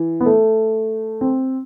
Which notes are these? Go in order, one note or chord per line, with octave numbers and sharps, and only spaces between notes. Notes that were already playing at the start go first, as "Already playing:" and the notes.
Already playing: E3
B3
A3
C4